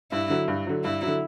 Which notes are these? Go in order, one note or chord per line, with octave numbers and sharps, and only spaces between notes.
G2 E4
D3 F#3
G2
D3 F#3
G2 E4
D3 F#3